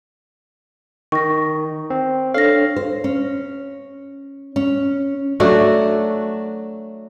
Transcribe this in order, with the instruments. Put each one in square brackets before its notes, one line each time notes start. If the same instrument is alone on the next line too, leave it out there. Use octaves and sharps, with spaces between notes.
[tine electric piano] D#3 [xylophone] C#6 A#6
[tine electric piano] C4
[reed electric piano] D4 C#5 [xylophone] A4 A#6 [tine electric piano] F5
[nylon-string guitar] C5
C#4
C#4
[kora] F#3 A3 D4 F#4